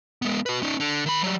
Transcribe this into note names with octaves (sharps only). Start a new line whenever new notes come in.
G#3 B3
F#4 B4
C#4 D#4
D3
D#3 B5
F#3 G3